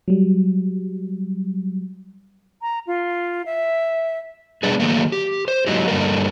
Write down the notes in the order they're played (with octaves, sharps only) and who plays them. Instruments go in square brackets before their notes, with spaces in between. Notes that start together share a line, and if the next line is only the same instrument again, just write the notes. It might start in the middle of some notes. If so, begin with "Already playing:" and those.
[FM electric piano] F#3 G3
[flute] A#5
F4
E5
[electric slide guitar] G3 G#3 B3 D4 G#4
D#3 F#3 A3 A#3
G4
C5
F#3 G#3 A#3 D#4 E4 G4
G2 D3 G3 A3 A#3 A#4